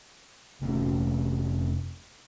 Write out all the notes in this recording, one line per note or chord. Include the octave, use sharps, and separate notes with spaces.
F1 C3 A3 C#4